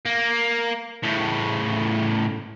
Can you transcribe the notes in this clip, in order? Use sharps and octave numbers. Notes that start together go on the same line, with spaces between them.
A#3
A2 C#3